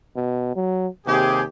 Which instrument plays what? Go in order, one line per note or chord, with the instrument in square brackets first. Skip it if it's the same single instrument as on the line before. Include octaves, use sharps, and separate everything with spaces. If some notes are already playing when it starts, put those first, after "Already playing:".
[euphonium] B2
F#3
[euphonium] D#2 [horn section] C3 G4 G#4